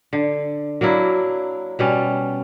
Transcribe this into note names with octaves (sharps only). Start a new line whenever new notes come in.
D3
F#3 A#3 D4 E4
B2 G3 C#4